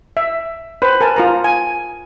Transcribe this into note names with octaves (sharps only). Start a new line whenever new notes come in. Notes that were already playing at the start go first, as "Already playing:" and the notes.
E5
B4 C5
A#4 G#5 A5
F4 A#4 A#5
G#5